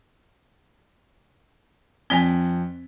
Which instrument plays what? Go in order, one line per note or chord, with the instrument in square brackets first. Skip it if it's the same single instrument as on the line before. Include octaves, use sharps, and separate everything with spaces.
[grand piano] F2 B6 G7 [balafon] C4 D5 G#5